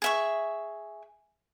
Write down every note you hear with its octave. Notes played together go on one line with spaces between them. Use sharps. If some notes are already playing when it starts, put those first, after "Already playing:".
G#4 E5 C#6